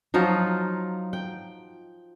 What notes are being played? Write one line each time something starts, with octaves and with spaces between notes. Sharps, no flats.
F3 F#3 D#4 F4
G5